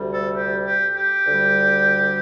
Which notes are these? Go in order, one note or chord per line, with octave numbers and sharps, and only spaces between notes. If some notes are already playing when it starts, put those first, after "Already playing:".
Already playing: D2 C3 G3
A4
G4
G4
G4
D2 D3 G3